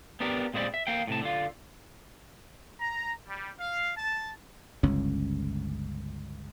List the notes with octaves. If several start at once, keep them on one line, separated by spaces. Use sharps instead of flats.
B3 D4 G4 A#4
A#2 G#3 C4 C5 D5 B5
E5
A#3 F5 G5
A2 C3 A5
D3 F4
A#5
G3
F5
A5
G1 C#2 C#4